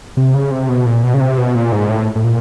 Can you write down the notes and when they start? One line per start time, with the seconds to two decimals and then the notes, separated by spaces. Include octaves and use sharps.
0.17 C3
0.34 C#3
0.51 C3
0.69 B2
0.86 A#2
1.03 B2
1.14 C#3
1.20 C3
1.38 B2
1.55 A#2
1.72 G#2
1.90 A2
2.16 A2
2.24 A#2